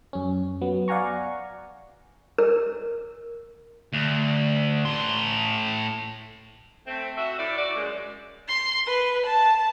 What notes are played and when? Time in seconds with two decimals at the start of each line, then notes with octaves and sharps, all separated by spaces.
0.13 F#2 C#4
0.61 F#3 B3
0.88 D5 F5 F#5 G#5 A#5 C#6
2.38 A#4
3.93 D2
4.85 A2 C6
6.87 A3 C4
7.17 F#4 E5
7.39 A2 A4 D5
7.57 F#4 D5
7.76 F#2 G#3
8.48 C6
8.86 B4
9.26 A5